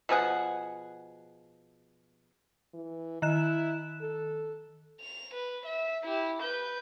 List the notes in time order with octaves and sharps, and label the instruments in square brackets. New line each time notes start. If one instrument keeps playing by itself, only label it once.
[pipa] B2 F3 G#4 F#5
[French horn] E3
[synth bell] D#3 F#6 E7 [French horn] E4
[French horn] A4
[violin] F7
B4
E5
E4 G4
B4 G6